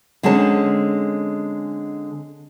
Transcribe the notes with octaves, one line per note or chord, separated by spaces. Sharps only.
D3 G#3 C4 C#4 A5